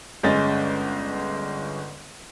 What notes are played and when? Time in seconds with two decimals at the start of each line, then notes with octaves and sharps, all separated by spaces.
0.23 G1 G#3 C#4 D#5 A6